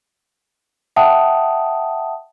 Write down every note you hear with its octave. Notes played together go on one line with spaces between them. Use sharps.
E5 F#5 G5 A5 D#6